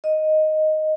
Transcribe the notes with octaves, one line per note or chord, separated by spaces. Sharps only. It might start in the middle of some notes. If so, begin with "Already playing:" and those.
D#5